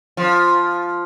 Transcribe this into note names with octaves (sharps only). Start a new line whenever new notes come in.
F3